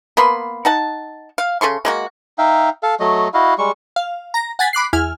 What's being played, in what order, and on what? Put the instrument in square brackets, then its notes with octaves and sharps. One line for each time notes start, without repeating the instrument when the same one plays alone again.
[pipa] A#3 B3 B5 C6
D#4 F#5 A5
F5
C#3 A4 C6 C#6
G#3 A#3 F#4
[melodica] D#4 E5 F5 G5
A4 F5
F#3 A3 D#5
E4 F#4 D#5 F5
G3 G#3 C#6
[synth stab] F5
A#5 A#6
F#5 G#5 A6 B6
B5 D6 F#6 C7
E2 E4 G#5 F6